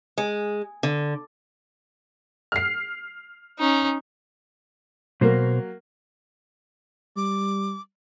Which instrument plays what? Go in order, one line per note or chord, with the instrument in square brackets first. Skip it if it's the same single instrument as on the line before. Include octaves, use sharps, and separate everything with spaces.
[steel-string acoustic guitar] G#3
D3
[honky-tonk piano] F6 C7
[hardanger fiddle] C#4 D#4
[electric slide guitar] B2 C5 [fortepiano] F#3 A#3
[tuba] G3 [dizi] D6